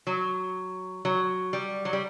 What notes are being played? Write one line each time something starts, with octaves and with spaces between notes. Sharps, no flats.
F#3
F#3
G3
F#3
G3